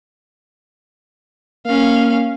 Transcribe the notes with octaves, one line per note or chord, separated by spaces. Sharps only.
A#3 C#4 F5